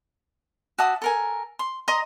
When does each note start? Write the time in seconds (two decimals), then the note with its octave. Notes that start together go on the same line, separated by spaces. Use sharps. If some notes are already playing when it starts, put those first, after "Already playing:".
0.78 F#4 E5 A5 D#6
1.02 A4 A#4 G#5
1.59 C6
1.88 D#5 A#5 C6 D#6